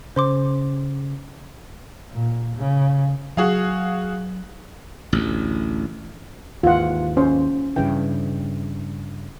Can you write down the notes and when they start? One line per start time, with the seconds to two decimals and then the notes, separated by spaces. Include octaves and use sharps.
0.16 C#3 C5 C6 D6
2.11 A#2
2.57 C#3
3.37 F#3 F#4 G#4 F5
5.13 A1 D2
6.63 D#2 G#2 E3 F4 F#5
7.17 C#4 C5
7.76 G2 C#3 E3 G5